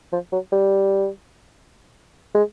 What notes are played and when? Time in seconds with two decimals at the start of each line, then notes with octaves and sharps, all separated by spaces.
0.12 F3
0.32 F#3
0.52 G3
2.35 G#3